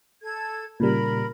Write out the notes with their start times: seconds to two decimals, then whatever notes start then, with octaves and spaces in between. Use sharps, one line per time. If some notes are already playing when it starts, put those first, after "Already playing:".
0.22 A4 G#6
0.80 A#2 C#3 G3 A#4 B5